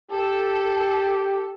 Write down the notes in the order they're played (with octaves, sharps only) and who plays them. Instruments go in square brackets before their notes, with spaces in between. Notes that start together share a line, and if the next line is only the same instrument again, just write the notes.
[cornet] G4 [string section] A4